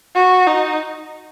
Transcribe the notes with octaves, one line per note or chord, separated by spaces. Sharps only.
F#4
D#4